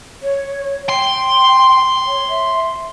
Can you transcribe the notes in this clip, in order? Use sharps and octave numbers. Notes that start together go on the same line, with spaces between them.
C#5
G5 C6
C#5
E5